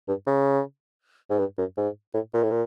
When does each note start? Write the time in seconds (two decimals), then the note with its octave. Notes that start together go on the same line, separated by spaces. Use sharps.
0.08 G2
0.27 C#3
1.30 G#2
1.39 G2
1.58 F#2
1.77 G#2
2.14 A2
2.33 A#2
2.43 A2
2.51 A#2